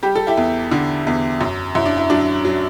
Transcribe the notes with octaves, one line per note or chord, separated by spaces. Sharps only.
G3 G4
A4
E4 G4
E2
D3
E2
F#2
F#2 E4
D4
E4
F#3 D4
F#3